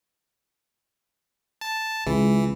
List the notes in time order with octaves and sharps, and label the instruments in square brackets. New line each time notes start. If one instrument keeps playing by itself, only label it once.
[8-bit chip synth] A5
[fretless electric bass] C#2 [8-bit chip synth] E3 [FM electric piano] G#3